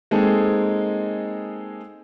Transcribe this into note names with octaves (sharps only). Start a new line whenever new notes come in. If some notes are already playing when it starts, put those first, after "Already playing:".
G#3 A#3 C4 D#4 G#4 A4